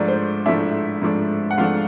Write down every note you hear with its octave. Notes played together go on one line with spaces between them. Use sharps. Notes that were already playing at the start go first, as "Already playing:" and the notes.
Already playing: G#2 F3 A3 D4 D5
C5
G#2 F3 A3 D4 E4 E5
G#2 F3 A3 D4
F#5
G#2 F3 A3 D4 F4 F5